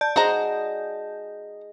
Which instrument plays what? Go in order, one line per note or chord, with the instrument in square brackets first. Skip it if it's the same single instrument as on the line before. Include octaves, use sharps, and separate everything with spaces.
[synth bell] D5 A5 G6
[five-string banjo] F#4 C5 A#5 [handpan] G#4 D#5